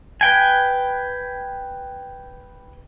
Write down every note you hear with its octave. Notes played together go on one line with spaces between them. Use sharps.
B4 G5 G#5